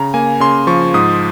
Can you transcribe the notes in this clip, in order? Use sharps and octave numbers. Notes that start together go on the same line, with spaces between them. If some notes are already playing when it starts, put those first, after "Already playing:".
Already playing: C#3 A#5
A#3 G#5
C#3 C6
F3 C#6
G#2 D#6